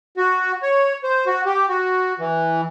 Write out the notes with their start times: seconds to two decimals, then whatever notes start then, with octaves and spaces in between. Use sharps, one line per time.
0.17 F#4
0.62 C#5
1.03 C5
1.26 F#4
1.46 G4
1.68 F#4
2.19 E3